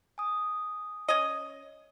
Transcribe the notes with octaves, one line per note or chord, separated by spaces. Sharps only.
G#5 D#6
C#4 D#5